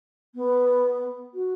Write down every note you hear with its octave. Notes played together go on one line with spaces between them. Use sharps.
B3
F#4